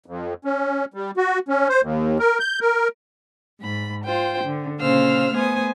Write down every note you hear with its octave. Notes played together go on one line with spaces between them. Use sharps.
F2
C#4
G3
F#4
C#4
C5
D#2
A#4
G6
A#4
G#2 B5
F4 C5 G5
D3
A#2 C#3 C5 F5 E6 F6
A3 B3 C5 G#5 D#6